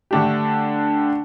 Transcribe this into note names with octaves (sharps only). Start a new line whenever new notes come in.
D3 A3 D4 G4